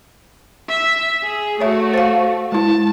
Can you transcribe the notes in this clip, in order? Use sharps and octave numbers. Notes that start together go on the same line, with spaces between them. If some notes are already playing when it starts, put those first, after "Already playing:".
E5
G#4
A3 F#4 C#5 E5
C5 F5
G#3 E4 A5